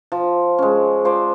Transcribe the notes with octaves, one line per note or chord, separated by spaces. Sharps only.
F3
G#3 C#4
F3 C5 D5